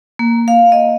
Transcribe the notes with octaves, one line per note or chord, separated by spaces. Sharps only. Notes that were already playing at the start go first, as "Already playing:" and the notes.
A#3
F5
D#5